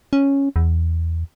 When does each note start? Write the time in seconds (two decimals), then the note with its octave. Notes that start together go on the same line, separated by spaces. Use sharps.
0.13 C#4
0.56 E2